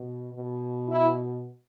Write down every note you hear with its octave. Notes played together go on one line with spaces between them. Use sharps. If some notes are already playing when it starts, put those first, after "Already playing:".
Already playing: B2
B2
E4